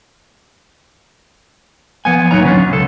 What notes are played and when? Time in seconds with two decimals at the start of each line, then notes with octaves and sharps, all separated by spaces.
2.05 F3 B3 G#5
2.31 D#2 A2 F#3 D#4 C#5 A#5
2.44 D3 C#4 D4 F4
2.70 C#2 A4